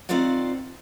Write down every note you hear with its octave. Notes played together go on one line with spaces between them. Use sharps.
D#3 C4 F4 C5 D5 F#5